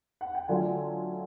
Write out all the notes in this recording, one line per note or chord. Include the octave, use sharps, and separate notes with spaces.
F#5
G5
D3 F#3 A3 D4 F4 G#5